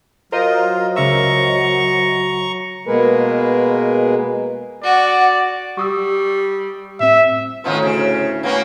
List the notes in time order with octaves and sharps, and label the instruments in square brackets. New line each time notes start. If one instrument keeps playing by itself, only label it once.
[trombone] F#3 [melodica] F4 [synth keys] A#4 C5 D#5
[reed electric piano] C#2 C#3 E5 [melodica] A#5 C#6
[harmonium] B2 G#3 A#3 G#4 A#4 B4
[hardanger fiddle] F#4 [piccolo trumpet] D5 [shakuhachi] F#5
[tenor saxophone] G3 [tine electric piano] C#6 D#6 E6
[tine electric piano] A2 C4 [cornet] E5
[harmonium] D2 A2 C#4 [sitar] D#3 F3 B3
[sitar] C#3
[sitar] A#3 B3 C#4 [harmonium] B4 C#5 G5